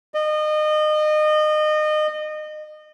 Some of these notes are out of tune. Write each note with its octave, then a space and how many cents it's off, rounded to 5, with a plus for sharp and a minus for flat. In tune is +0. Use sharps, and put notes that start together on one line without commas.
D#5 -30